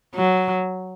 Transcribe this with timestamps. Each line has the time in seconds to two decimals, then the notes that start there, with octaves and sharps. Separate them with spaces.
0.15 F#3